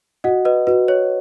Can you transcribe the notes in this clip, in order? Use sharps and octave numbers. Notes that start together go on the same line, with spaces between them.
F#4 D#5 F#5
B4 D#5
F#4 B4
C#5